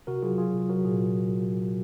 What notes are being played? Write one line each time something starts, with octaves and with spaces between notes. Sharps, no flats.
C3 F#4 A#4
F#3 F4 G#4
F#3 F4 G#4
C3
F#3 F#4 A#4
A#2 F4 G#4